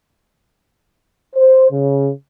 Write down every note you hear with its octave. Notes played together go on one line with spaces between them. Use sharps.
C5
C#3